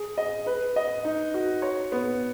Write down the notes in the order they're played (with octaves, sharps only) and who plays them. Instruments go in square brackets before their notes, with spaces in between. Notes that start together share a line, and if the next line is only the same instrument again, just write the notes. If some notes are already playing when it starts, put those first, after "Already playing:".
Already playing: [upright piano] G#4
D#5
B4
D#5
D#4
F#4
C#5
B3